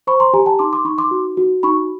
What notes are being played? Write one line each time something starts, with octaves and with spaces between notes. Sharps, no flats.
C5 B5 C#6
A#5 C6
G4 G#5 A#5
G5 A5
D#4 C6 D6
C6 D6
D#4 B5 C#6
C6 D6
F#4
F#4
D#4 B5 C#6